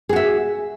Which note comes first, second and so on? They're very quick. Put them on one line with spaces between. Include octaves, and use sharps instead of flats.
G#4 F#4 E5